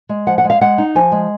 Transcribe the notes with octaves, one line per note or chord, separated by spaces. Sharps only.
G#3
F3 F#5
F#5
G#3
F5
G#3 F#5
D#4
F3 G#5
G#3